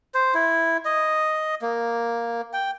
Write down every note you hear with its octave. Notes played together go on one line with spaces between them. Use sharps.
C5
E4
D#5
A#3
G5